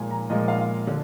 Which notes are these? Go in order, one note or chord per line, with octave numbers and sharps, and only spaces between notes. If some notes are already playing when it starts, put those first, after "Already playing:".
Already playing: A#2 F3 G#3 G#5
A#5
A#2 F3 G#3 D#5
F5
D3